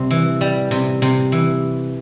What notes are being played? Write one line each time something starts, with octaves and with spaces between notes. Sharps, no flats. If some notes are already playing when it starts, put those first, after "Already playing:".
Already playing: C3 G3
E3
G3
C3
C3
E3